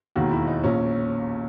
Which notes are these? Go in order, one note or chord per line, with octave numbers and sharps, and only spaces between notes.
E1 D#2 D#3 F#4
E4
D#4
A#1 A#2 C#4